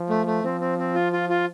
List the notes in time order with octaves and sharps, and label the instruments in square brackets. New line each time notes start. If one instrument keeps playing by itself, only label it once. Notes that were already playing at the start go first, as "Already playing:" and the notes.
Already playing: [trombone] F3
[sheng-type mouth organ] A3
A3
[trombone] F3 [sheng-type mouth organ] C4
[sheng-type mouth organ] C4
C4
F4
F4
F4